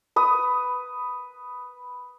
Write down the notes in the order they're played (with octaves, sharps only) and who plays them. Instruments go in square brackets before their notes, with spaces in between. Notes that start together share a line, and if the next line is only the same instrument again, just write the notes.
[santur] B4 D#6